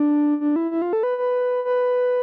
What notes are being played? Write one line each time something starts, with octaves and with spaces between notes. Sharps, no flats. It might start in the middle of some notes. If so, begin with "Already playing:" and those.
Already playing: D4
D4
E4
E4
F4
A4
B4
B4
B4